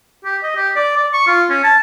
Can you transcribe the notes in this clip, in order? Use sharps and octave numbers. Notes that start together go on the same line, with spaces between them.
G4
D#5
G4
D5
D5
C#6
F4
C#4
A5